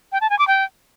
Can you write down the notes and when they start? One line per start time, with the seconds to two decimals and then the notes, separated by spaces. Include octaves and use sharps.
0.12 G5
0.21 A5
0.30 G#5
0.39 D6
0.47 G5